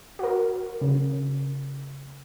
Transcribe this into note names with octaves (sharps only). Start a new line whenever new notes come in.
F#4 A#4
C#3